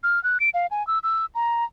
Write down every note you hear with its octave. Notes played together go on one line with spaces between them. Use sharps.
F6
F#6
D7
F5
G#5
E6
E6
A#5